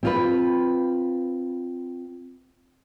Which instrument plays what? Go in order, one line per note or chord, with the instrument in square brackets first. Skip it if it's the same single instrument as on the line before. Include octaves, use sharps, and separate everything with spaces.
[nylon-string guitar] C4 F4 B4